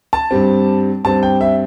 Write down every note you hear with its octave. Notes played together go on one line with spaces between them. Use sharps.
A5
G2 G3 C4
G2 G3 C4 A5
G5
E5